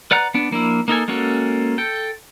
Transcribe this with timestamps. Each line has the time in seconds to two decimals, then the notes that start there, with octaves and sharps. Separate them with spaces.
0.11 B4 D5 F#5 A#5 F#6
0.34 B3 D4
0.51 F3 A#3 D4 E4
0.88 A#3 D#4 A4 G#5
1.08 G#3 A#3 C#4 F#4 A4
1.78 A4 G5